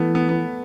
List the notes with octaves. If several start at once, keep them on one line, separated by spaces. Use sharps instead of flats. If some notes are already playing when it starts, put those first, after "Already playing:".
Already playing: E3 A3 B3
B3
B3